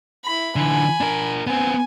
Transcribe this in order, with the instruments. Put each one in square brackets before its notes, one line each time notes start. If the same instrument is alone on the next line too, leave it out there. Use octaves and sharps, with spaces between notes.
[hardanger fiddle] E4 B5
[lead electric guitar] D3 E3 [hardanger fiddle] G#5 B5
[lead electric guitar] D4 A#4
[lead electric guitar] B3 C4 [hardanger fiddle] G#5